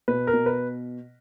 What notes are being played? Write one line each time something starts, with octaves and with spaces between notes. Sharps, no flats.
B2 B4
A#4
B2
B4